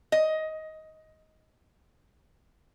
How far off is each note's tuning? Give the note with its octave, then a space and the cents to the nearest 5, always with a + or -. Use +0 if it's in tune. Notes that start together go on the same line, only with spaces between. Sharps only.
D#5 +15